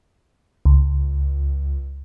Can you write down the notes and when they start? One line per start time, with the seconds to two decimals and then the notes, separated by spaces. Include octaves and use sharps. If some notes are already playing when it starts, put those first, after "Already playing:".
0.65 C#2